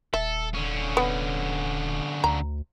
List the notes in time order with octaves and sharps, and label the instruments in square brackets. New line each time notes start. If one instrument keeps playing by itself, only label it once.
[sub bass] D#1 [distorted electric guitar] A4 [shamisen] E5
[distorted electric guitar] D3 C#4
[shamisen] B3
[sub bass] D2 [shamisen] A#5